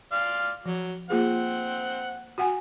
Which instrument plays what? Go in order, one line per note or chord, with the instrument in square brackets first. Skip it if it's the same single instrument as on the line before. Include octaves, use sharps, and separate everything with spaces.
[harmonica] D5 F5 C6
[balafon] F3 [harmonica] F#3
[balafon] A#3 F4 G#4 [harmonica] C4 F#5
[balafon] F#4 F#5 G#5